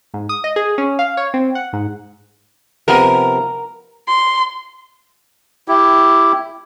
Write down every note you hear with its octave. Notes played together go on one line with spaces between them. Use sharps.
G#2
D#6
D#5
G#4
C#4
F5
C#5
C4
F#5
G#2
C3 F3 B3 A#4
C6
E4 G4